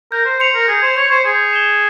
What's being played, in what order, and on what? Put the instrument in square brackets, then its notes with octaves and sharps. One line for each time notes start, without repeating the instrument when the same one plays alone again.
[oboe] A#4 [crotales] G6
[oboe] C5
[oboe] C5 [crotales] C#7 F7
[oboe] A#4
[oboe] G#4 [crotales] G6
[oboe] C5
[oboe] C#5 [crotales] C#7 F7
[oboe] C5
[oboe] G#4 [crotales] G#6
[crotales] E7 G7